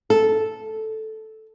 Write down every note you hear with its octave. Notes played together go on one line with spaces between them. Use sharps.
A4